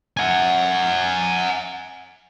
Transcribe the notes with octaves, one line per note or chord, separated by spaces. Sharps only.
F#5 G#5